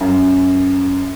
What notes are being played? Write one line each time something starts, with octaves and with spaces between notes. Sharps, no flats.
F#2